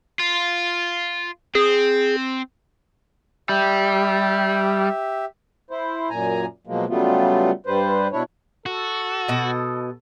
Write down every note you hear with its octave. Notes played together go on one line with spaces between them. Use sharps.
F4
C4 G#4
G3 G4 E5
E4 C5
F#2 A#2 G#5 A#5
B2 F3 F#3 G#3 A#3
C#3 F#3 G3 A3 B3 F4
G2 G3 B4 C5
B2 D4 E4 C#5
F#4 A4
B2 D#5